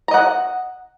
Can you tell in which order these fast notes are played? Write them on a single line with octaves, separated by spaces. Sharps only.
A#5 D#5 F#5